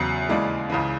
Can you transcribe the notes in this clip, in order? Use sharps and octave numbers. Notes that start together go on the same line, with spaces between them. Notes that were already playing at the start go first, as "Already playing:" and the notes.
Already playing: E2 C#3 F#3
D#2 C#3 E3 G#3 D5
C#2 C#3 E3